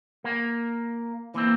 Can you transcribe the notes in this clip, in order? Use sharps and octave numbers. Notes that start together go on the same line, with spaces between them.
A#3
E3 A#3 C4